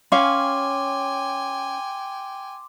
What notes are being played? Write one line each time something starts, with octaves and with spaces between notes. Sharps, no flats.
C#4 F5 G5 G#5 C6 D6